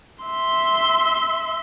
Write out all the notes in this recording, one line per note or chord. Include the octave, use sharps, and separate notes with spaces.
E5 C6